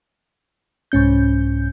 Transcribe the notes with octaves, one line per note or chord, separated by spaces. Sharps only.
C2 G#2 C#4 G6